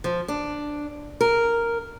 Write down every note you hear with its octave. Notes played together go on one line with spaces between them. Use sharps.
F3
D4
A#4